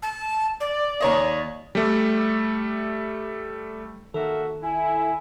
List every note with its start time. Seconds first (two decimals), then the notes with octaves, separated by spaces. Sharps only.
0.03 A5
0.60 D5
1.00 D#2 C#5 D#5
1.75 G3 A3
4.14 D#3 A#3 F#4 A4 E5
4.62 E4 G#5